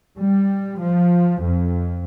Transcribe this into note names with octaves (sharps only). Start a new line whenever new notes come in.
G3
F3
F2